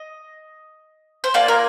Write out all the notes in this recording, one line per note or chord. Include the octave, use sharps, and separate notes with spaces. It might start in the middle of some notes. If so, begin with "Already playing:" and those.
Already playing: D#5
C5
A#3 F4 G#4 D5
A#4